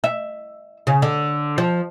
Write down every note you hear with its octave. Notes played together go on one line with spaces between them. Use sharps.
E5
C#3
D3
F3